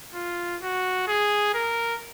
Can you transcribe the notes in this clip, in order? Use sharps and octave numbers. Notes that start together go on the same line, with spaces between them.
F4
F#4
G#4
A#4